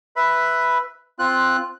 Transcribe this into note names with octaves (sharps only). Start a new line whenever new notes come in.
B4 E5 B5
C4 F4 F#6